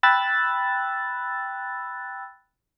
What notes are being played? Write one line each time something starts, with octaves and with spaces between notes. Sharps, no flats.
G5 B5 E6 F#6 A6